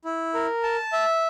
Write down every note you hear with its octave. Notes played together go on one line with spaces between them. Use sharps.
E4
A#4
A5
E5